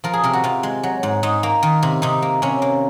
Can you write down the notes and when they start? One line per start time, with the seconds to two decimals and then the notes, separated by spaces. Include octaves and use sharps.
0.04 F3 A#4
0.13 G#4
0.24 C3 A#4
0.33 F#4
0.44 C3 F4
0.63 G#3
0.83 F#3
1.03 G#2
1.23 G#2 D#4
1.43 A#3
1.63 D#3
1.83 C3
2.02 C3 D#4
2.22 A#3
2.42 C3 C#4
2.62 A#3